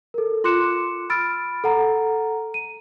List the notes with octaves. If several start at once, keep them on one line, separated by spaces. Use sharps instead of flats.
A4 A#4
F4 C6 D6 F#6 C#7 E7
B5 E6 F6 A6 D7
A4 F#5 A#5
D#7